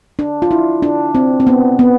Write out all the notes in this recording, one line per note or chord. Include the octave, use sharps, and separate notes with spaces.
D4
F4
E4
D4
C4
C4
B3
B3